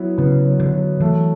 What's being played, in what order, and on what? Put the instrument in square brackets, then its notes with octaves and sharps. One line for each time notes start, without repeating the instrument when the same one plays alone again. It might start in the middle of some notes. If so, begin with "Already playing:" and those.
Already playing: [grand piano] F#3 B3 E4
[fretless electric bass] C#3 [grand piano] B3
[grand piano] F#3
[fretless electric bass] D3
[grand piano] F#3
[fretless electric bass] E3 [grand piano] A3